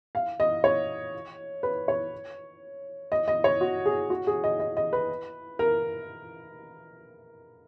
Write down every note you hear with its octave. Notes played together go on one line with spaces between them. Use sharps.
F5
D#5
C#5
B4
C#5
D#5
D#5
C#5
F#4
G#4
F#4
G#4
D#5
D#5
D#5
B4
A#4